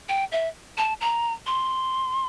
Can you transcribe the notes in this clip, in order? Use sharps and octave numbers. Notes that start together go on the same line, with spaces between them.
G5
E5
A5
A#5
C6